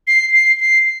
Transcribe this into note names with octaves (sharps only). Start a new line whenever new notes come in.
C7
C7
C7